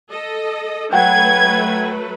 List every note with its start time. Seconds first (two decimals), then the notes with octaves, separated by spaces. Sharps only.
0.11 A4 D#5
0.93 F#3 A3 B4 F#5 G5 G#6